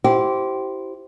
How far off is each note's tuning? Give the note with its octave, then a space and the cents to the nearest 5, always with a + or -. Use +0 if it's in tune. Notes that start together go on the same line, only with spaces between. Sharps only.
E4 +0 G4 -25 C5 +0